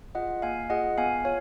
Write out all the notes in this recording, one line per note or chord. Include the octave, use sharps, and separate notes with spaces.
F4 G#4 D#5 F#5
A#3 F5 G#5
F4 G#4 D#5 F#5
B3 F5 G#5
F4 C#5 F5